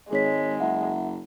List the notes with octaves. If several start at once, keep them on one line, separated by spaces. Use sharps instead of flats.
G#1 G#3 G#4 C#5 B6
F#1 E5 F#5